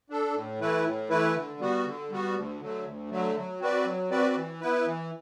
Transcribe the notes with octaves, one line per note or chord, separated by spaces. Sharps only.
D4 A4
A2
E3 A3 E4 B4
A2
E3 A3 E4 B4
D3
G3 B3 F#4
D3
G3 B3 F#4
D2
D3 F#3 A3
D2
D3 F#3 A3
F#3
C4 F#4 B4 D5
F#3
C4 F#4 B4 D5
E3
B3 E4 B4
E3